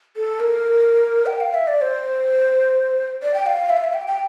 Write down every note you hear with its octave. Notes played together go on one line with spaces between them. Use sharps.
A4
A#4
G5
F5
E5
D5
C5
D5
G5
F5
E5
F5
E5
G5
G5